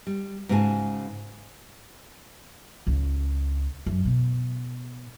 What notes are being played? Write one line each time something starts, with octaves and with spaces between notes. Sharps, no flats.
G3
G#2 C#3 F#4 A4 G#5 A5
C#2
F#2
B2